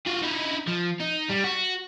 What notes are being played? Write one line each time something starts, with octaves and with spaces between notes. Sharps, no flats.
F4 F#4
D#4 E4
F3
D#4
G3
F#4